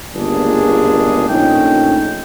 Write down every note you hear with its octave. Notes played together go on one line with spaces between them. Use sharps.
G1 C#2 G#3 A#3 D4 G#4
A#1 A3 C#4 D#4 G5